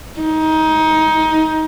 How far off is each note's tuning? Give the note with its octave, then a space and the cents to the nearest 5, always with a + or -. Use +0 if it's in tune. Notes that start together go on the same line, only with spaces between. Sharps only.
D#4 +20